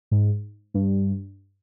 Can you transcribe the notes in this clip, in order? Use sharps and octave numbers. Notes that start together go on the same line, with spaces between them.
G#2
G2